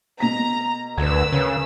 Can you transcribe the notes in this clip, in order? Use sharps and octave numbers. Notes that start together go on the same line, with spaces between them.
B2 A#5 B6
D2 A#4 B4 E6 G#6
C#3